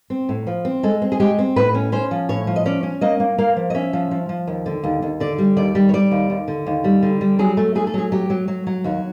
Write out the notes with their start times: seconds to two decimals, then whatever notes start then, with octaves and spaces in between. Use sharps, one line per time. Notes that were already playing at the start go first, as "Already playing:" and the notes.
0.10 C4
0.29 A2
0.47 F3
0.65 C4
0.83 G#3 A4
1.02 C4
1.12 G#4
1.20 G#3 G4
1.38 C4
1.56 A2 B4
1.74 C#4
1.92 C#4 C5
2.11 F3
2.29 A2 C#5
2.47 F3
2.56 D#5
2.66 C#4 D5
2.83 C#4
3.01 A#3 D#5
3.20 A#3
3.38 A#3 F5
3.56 F3
3.70 D#5
3.74 C#4 E5
3.93 F3
4.11 F3
4.29 F3
4.47 D#2
4.66 D3
4.84 D#2
5.02 D#2
5.20 D3 D5
5.38 G3
5.57 D#2 D5
5.75 G3
5.89 C#5
5.94 G3 D5
6.11 D#2
6.30 D#2
6.48 D3
6.66 D#2
6.84 G3
7.03 D3
7.21 G3
7.39 F#3 G#4
7.57 A3
7.75 A3 G#4
7.87 A4
7.94 F#3 G#4
8.12 F#3 G4
8.30 F#3
8.48 F#3
8.67 F#3
8.84 D#2 F#4